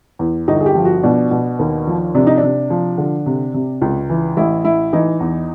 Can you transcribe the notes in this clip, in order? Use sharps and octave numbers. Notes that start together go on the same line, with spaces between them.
E2
G1 D#4
G#4
G4
F3
F#4
B2 D4
B2
D#2
F3
C3 D4
D#4
D4
C3
F3
D3
C3
C3
C#2
E3
A1 E4
A1 E4
E3 D#4
E2